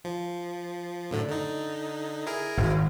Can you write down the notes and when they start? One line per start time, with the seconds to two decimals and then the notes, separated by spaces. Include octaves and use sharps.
0.04 F3
1.11 F#2 A2 D3
1.28 D3 D#4
2.27 E4 G#4 A#4
2.57 G#1